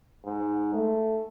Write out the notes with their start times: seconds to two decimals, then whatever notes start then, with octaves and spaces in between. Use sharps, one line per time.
0.25 G#2
0.74 A3